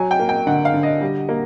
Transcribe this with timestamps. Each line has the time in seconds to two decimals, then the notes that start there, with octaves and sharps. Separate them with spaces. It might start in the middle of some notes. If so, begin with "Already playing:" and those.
Already playing: F#3 G#5
0.11 G5
0.20 A#3
0.29 G5
0.47 D3 F#5
0.65 F5
0.74 D3
0.83 D#5
1.01 G3
1.29 A#3